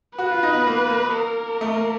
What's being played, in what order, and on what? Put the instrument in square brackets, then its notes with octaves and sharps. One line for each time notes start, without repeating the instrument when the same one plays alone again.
[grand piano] F#4 [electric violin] B4
[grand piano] F4
D#4
B3
A#3
A#3
[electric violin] A#4
[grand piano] A3
A#3